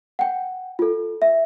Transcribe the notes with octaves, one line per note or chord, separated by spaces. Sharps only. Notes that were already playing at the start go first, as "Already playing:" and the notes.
F#5 G5
F4 A4
E5